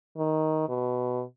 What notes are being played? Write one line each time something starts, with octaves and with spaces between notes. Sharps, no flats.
D#3
B2